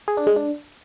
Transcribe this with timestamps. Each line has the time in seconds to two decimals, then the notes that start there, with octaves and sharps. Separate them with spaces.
0.08 G#4
0.17 D4
0.27 G#3
0.36 D4